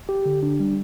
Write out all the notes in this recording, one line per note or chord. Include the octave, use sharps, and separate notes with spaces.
G4
D3
D4
G3